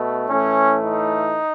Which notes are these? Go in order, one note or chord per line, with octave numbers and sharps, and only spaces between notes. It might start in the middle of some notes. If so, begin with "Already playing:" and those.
Already playing: B2 A3
A2 E3 A3 C#4
D#4